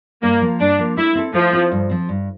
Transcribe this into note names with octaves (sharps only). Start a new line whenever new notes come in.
G2 A#3
F3 A#3
G2 D4
F3 A#3
A3 E4
C4 E4 A4
F3 A3
C4 E4 A4
G2
F3 C4
G2